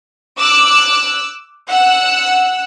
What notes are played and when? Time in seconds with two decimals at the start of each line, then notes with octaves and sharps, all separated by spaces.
0.38 D6 E6 F#6
1.69 F#5 E6 F#6